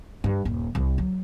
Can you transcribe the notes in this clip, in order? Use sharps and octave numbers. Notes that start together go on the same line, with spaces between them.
G2
D#1
C2
F#3